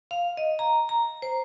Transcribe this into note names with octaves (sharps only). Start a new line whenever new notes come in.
F5
D#5
A#5
A#5
C5